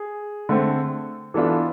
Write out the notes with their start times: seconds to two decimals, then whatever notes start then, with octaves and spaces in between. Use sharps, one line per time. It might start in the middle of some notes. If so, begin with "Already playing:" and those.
Already playing: G#4
0.49 D3 A3 C4
1.34 E3 B3 D4 F4 A4